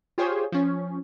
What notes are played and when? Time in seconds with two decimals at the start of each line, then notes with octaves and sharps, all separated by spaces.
0.18 F4 G4 G#4 C5 C#5
0.52 F3 C#4